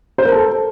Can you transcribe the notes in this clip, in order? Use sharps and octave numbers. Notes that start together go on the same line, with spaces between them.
C5
A#4
A4